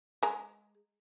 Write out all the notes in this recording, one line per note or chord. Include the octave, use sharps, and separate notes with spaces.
G#3 A#5